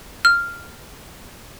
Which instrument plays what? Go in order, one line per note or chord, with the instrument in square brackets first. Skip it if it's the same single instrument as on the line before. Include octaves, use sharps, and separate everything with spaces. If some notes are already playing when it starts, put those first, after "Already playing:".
[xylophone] F6